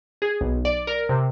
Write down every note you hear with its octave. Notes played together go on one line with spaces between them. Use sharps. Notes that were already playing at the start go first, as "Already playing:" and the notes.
G#4
B1
D5
A#4
C3